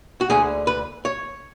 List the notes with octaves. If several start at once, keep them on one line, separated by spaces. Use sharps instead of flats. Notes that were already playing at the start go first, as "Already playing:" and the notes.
F#4
D2 D3 G#4
B4
C#5